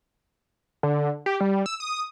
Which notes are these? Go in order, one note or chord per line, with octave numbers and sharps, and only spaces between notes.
D3
G4
G3
E6
D#6